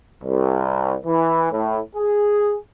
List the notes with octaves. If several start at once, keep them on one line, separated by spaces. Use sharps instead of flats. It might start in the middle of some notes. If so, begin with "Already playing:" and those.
C2
E3
A2
G#4